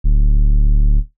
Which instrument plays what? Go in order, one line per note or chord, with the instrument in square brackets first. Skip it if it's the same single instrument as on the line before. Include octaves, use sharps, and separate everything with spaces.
[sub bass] D1